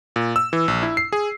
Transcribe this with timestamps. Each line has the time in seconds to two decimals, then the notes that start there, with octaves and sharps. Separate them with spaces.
0.16 A#2
0.36 E6
0.53 E3
0.68 A#1
0.83 E4
0.97 C7
1.12 G#4